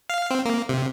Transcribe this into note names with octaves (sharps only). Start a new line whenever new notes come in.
F5
C4
A#3
C3